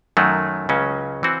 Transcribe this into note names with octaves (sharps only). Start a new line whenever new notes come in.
F#2 D#3 F#3 A3
C#2 C#3 F#3 C#4
E3 C4 F#4